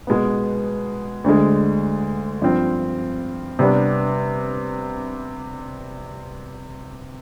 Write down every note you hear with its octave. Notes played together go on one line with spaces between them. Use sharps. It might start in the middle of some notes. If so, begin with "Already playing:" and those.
B2 G#3 B3
D2 D3 G#3
G2 F3 C4
C3 G3 B3 D4